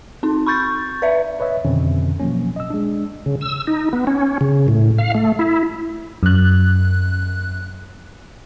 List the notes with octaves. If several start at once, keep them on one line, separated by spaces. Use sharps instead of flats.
C4 D#4
B5 C#6 G6 A6
B4 D5 E5
B4 C#5 D#5 E5
F2 B2 D3 D#3 C4 C#4
B2 F3 F#3 A#3 C#4
D#5 E6
G#3 D4
C#3
E6
D#4
B3
C#4
C#3
A2
F5
A3
E4
F#2 F#6